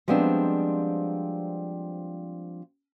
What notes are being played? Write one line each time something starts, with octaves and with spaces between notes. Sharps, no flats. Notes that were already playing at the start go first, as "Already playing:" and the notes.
F3 G3 G#3 B3 C4 D4